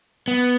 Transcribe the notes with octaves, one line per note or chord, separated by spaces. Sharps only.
B3